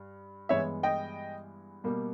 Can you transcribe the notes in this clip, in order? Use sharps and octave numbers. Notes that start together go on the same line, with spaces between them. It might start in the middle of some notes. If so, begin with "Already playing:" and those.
Already playing: G2
G2 E3 G#3 B3 C#5 E5
D#5 G5
B2 G3 A#3